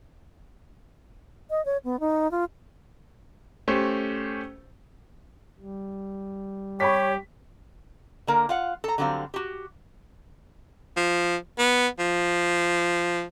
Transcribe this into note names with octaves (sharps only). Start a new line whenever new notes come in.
D#5
C#5
B3
D#4
F4
A3 C#4 G4 C5
G3
G4 C#5 B5 C#6 B6
D3 A#3 A#4
F4 F5 F#5
A4 A#5
D3 F#3 G3 C4 F5
F#4 G4
F3
B3
F3